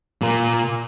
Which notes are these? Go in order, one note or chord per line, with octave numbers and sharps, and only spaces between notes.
A#2 A#3